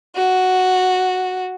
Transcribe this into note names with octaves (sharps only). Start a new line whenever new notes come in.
F#4